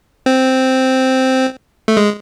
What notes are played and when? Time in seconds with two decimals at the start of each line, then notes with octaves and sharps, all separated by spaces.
0.26 C4
1.88 A3
1.97 G#3